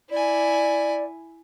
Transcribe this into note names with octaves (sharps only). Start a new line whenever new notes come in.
E4 D5 G#5